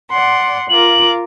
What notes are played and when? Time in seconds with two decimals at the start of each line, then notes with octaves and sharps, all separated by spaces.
0.10 D5 F#5 C6
0.70 F4 A#4 D6 F#7